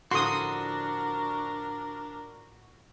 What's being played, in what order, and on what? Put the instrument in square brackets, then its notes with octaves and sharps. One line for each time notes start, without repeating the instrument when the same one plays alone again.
[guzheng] A2 D3 F3 [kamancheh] D4 A#4 [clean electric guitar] F#4 [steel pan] C6 D#6